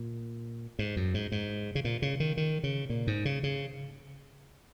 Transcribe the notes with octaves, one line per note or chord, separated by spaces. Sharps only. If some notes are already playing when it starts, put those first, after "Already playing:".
Already playing: A#2
G#2
F#2
G#2
G#2
C#3
A#2
C#3
D#3
D#3
C#3
A#2
G#2
C#3
C#3